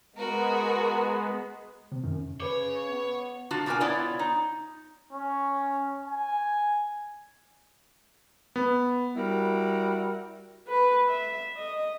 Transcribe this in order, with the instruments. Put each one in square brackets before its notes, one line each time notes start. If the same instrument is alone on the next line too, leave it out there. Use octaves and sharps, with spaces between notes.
[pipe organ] G#3 B3 [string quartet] F#4 A#4
[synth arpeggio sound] C3
[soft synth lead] F#2 [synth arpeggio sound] D#3
[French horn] C#3 [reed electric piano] B4 D6 [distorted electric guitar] C#5
[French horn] B3
[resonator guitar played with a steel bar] D4 F4 F#4
B2 D4 A#4 B4 G#5
B3 E4 F4 C#5 D5
D#4
[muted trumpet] C#4
G#5
[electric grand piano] B3
[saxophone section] G3 E4 F#4 A#4
[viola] B4
E5
D#5